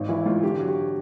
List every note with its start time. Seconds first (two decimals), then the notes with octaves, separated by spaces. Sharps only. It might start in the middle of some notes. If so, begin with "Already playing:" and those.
Already playing: G#1 D#4
0.09 E3 E4
0.26 G#2 F4
0.43 D3 G4
0.60 F#3
0.68 G4